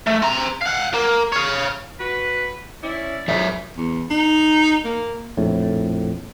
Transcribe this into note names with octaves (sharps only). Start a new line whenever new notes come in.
A3
C4 A#5
F5 F#5
A#3
C#5 F5
F#4 B4
C#4 E4 D5
F2 G#2 F#3 D#4 E5
E2
D#4
A#3
A#1 F2 A2